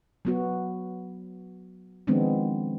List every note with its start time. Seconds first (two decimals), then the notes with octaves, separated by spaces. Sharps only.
0.25 F#3 B3 F#4
2.07 D#3 F3 G#3 B3 C4 D4